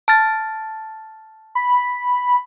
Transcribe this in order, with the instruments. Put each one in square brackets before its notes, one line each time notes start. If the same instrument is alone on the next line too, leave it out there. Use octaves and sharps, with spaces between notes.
[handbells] A5 F6 A6
[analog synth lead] B5